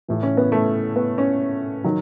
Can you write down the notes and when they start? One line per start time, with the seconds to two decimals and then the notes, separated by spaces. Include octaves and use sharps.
0.08 A2 E3
0.23 C#4
0.37 B3
0.52 A3
0.96 B3
1.18 C#4
1.84 D#3 F#3